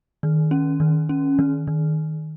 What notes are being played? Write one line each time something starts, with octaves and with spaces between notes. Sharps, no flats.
D#3
C#4
D#3
C#4
D#3
D#3